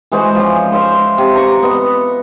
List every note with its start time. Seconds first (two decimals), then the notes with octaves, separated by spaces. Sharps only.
0.12 E3 G#3 F#4 C5
0.35 F3 C#4
0.72 C5 E5 F5 C6
1.18 C3
1.35 A#5 C#6 D6
1.63 B3 D#5